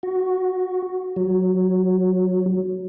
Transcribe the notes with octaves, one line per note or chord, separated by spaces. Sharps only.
F#4
F#3